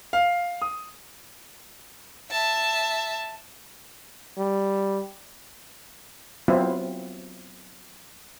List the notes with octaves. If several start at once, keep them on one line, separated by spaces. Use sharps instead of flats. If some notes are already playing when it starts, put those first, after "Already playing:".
F5
D#6
E5 A5
G3
F#3 B3 C4 E4 F4